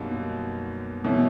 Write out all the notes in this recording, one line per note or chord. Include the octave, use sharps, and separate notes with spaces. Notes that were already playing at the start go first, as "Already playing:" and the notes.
Already playing: F#2 B2 D3 G3 A#3 D#4
B2 E3 A3 C#4 E4